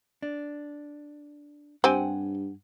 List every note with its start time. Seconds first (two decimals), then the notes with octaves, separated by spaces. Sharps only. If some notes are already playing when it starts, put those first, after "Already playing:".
0.22 D4
1.84 G2 C4 G4 F#5 G#5